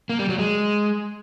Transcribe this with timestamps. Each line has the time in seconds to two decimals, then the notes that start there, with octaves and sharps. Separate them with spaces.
0.09 A#3
0.19 G3
0.29 F#3
0.39 G#3